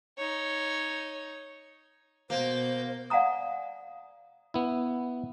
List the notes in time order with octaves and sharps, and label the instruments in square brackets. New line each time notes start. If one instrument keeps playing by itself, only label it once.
[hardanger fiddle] D#4 C#5
[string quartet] B2 G6 [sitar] A#3 [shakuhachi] C5
[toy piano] D5 F5 F#5 G#5 A#5 D#6
[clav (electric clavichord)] B3 E4